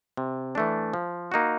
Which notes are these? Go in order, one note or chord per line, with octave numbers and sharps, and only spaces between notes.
C3
E3 A3 D4
F3
A#3 D#4 F#4